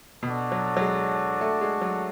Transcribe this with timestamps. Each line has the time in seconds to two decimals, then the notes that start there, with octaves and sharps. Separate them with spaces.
0.22 B2 D4 F#4 A4
0.52 F#3
0.77 F#3
0.81 G#3
1.41 A3
1.61 G#3
1.81 F#3